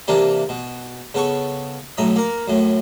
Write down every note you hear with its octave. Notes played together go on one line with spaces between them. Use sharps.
C3 E3 A#3 D4 G4
B2
C#3 B3 A4 A5 C#6
B1 A2 E5 A#5 D#6
A#3 A#4
F#2 A2